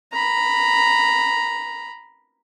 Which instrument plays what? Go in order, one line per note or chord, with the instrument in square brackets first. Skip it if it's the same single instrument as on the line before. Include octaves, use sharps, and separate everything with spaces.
[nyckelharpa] A#5 B5